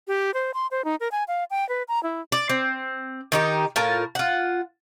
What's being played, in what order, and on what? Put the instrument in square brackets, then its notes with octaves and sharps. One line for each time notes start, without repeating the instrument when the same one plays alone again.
[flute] G4
C5
C6
C5
D#4
A#4
G#5
F5
G5
B4
A#5
E4
[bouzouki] D5
C4
D#3 D#4 G4
A2 F4 A#4 A5
F4 F#5